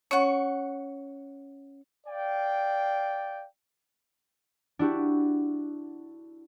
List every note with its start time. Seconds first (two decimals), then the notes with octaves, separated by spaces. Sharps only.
0.11 C#4 C#5 F#5 C#6
2.07 D5 F5 G5
4.79 D4 E4 F#4 G4